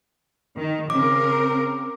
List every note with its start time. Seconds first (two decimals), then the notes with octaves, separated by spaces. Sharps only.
0.57 D#3
0.90 C#3 C4 A#4 D6